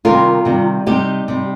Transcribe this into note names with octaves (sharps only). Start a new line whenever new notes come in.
C3 D#3 G3 F4 A#4
C3 D#3 G3
C3 G3 D#4 G4
C3 G3